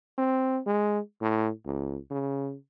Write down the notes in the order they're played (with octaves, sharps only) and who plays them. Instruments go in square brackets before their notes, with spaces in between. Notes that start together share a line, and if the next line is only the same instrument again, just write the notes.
[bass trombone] C4
G#3
A2
C#2
C#3